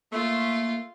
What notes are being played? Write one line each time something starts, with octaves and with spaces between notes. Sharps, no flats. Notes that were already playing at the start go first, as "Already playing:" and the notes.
A3 A#3 F4